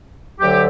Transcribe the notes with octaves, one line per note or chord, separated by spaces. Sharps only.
D2 D3 F#3 G4